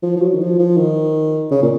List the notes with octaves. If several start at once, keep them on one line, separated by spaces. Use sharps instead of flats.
F3
F3
F#3
D#3
F3
F3
D#3
C#3
A#2